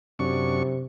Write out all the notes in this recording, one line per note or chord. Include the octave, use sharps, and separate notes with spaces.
F#2 C3 D4 C#6